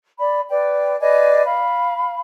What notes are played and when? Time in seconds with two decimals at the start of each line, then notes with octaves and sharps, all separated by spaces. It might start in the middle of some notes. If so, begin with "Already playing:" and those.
0.19 D5 B5
0.50 B4 D5 G5
1.00 B4 D5 D#5 G#5
1.45 F5 B5